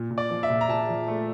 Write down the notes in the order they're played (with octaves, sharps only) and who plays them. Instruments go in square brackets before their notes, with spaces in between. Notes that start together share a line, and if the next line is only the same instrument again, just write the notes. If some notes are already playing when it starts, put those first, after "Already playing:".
Already playing: [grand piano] A#2
A#2
D5
F3
E5
A#2
A#5
A#2 A5
F3
A3